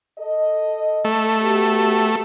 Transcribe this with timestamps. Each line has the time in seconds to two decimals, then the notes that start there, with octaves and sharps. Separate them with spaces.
0.18 A4 D#5
1.05 A3
1.41 B3 F#4 G4